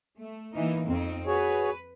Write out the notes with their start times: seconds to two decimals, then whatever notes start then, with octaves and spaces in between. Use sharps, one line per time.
0.17 A3
0.54 E3 A#3 D#4
0.87 F2 C4 D#4
1.26 F#4 G#4 B4 C#5